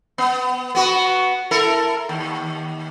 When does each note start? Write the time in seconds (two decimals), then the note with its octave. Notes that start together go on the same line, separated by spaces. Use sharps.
0.18 B3
0.75 B3 F#4 B4
1.51 E4 A4 A#4
2.09 D#2